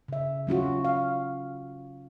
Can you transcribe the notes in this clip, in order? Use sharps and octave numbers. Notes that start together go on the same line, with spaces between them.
C#3 E5
F#3 C#4 F4 F#4
F5